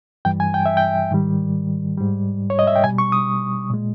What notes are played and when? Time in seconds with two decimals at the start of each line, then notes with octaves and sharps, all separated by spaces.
0.25 G2 E3 G3 G5
0.40 G#5
0.54 G5
0.66 E5
0.77 G5
1.11 G#2 D#3 G3
1.98 G#2 G3
2.50 C#5
2.59 D#5
2.67 E5
2.76 G5
2.84 B2 G3 G#5
2.98 C#6
3.12 D#6
3.70 A#2 G#3